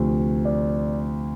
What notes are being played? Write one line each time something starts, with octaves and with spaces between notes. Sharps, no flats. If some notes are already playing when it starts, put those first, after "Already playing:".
Already playing: D2 C3 F3
D5